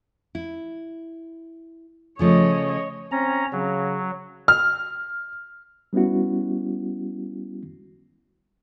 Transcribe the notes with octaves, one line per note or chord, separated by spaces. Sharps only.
E4
C#3 F3 A3 C#5 D#5
C4 C#4 A#5
C#3 F#3
F6
G3 B3 C#4 E4 F#4